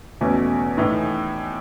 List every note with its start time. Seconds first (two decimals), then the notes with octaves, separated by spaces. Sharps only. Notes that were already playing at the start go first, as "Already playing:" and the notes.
0.21 E2 B2 A3 C#4
0.77 A2 E3 A3 D#4